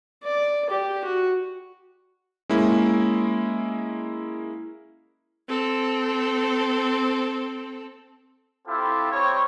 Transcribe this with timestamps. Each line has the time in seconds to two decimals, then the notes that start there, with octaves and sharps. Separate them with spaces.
0.24 D5
0.70 G4
1.04 F#4
2.49 G#3 A#3 C#4 E4
5.48 C4 A4
8.67 C4 E4 F4 G4 A4
9.11 G3 C4 C#5